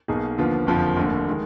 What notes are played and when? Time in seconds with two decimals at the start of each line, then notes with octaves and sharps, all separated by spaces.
0.08 B1 B2 A#3 D#4 G#4
0.38 D#2 D3 F3 B3 F4
0.67 F#1 F2 D3 F3
0.96 F1 D#2 D3
1.28 D#3 G#3